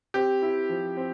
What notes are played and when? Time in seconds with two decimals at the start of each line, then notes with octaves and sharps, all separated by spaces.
0.14 C4 G4
0.42 E4
0.69 F3
0.97 C4